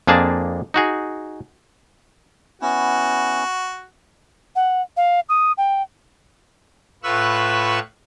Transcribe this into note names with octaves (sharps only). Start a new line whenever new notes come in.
F2 A#3 D4 G#4 A5
D#4 F#4 G#4
B3 C#4 E4 F#4
F#5
F5
D#6
G5
A2 F4 B4 C#6 E6 F#6